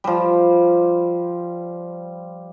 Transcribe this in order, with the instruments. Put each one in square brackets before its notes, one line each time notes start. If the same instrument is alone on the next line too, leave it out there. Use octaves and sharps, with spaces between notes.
[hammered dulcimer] F3 G3